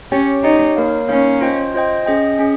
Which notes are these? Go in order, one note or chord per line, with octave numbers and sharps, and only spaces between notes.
C#4 G4 C#5 G5
D#4 G4 C#5 G5
A#3 D#4 A#4 C#5 F5
A#3 C#4 D#4 A#4 C#5 F5
F4 C5 D#5 G5
F4 C5 D#5 G5
C#4 G#4 D#5 G5
C#4 G#4